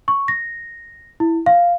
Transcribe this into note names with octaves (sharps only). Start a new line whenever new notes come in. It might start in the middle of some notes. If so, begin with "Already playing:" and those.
C#6
A#6
E4
F5